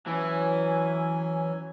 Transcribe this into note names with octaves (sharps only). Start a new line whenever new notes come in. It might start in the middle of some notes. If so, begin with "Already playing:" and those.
E3 F#3 C#4 G#5